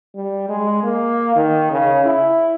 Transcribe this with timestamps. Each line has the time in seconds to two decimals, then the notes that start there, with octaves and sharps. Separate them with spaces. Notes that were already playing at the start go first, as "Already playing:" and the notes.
0.15 G3
0.49 G#3
0.83 A#3
1.36 D#3
1.71 C#3
2.05 E4